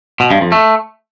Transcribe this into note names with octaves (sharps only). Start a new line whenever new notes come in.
B2
G2
F2
A3